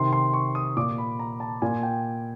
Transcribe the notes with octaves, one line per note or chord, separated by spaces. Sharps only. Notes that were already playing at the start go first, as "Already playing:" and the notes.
Already playing: C3 D#3 C6
C6
C#6
D#6
A#2 D6
B5
A#5
A5
A#2 G#5
G5